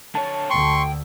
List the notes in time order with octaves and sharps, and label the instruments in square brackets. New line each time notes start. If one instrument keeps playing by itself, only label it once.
[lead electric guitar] D3 C#5 [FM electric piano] A5
[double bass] D2 D3 [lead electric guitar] G5 [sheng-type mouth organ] C6 C#6